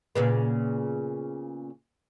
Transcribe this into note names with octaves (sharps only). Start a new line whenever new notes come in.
A#2 C#3 B3